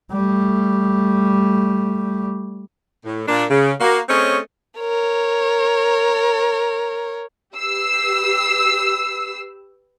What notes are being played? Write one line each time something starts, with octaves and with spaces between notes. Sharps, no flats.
G3 A3
A2
A#2 A#3 D4
C#3
A#3 F#4
A3 C4 C#4 G#4 C#5 D#5
A#4 C#5
G4 B4 E6 C7